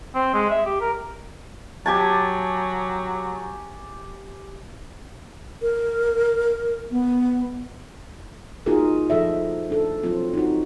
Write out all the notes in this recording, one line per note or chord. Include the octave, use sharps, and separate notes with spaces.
C4
G#3
E5
G4
A#4
F#3 G4 G#5 A5
A#4
B3
A#3 D#4 F4 F#4 G#4 A#4
F3 A4 D#5 E5
D4 A4
F3 F#3 C4 F4
D#4 F#4